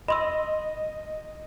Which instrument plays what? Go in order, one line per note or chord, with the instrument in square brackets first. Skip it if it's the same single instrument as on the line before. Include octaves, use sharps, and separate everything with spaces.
[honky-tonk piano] D#5 [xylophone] B5 C6 E6